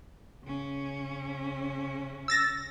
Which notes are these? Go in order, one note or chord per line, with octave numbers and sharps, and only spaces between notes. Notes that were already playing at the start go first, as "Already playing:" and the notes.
C#3 C#4
E6 A6 A#6